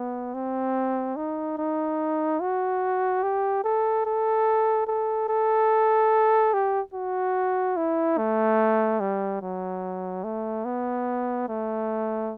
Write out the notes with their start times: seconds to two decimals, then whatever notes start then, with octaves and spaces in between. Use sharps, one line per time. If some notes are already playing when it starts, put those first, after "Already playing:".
Already playing: B3
0.34 C4
1.16 D#4
1.57 D#4
2.40 F#4
3.23 G4
3.63 A4
4.06 A4
4.87 A4
5.29 A4
6.53 G4
6.94 F#4
7.77 E4
8.18 A3
9.00 G3
9.41 F#3
10.24 A3
10.65 B3
11.48 A3